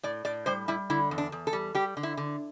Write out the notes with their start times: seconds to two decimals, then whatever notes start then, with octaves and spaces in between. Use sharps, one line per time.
0.03 A2 D5
0.25 A2 D5
0.46 G3 C5
0.68 G3 E4
0.90 D3 E4
1.11 E2
1.18 D4
1.32 E2
1.47 A4
1.53 G3
1.75 G3 G4
1.97 D3
2.03 E4
2.17 D3